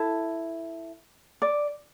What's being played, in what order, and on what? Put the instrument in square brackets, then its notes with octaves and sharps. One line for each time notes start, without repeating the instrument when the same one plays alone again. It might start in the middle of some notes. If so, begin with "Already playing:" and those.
Already playing: [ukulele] E4 A4
D5